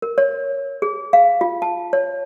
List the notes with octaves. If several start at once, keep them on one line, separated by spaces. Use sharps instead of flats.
A#4
C#5
G#4
F5
F4
A5
C#5